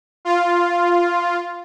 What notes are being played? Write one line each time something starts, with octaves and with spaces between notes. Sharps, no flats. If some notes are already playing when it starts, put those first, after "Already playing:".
F4